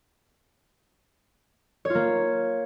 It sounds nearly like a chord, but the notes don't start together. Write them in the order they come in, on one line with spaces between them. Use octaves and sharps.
C#5 F4 A#3